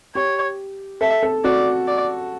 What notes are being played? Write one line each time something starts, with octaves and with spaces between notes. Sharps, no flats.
G4 C#5
A4 E5
A4
F#4 D5
D5